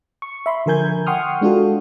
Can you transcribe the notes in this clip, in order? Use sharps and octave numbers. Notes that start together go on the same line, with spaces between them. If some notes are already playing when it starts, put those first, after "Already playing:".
C#6
E5 B5 C6
D3 F3 A#4 G#5 G6 G#6
F#5 G5 C6 C#6 D#6 F6
G#3 D4 F4 F#4 A4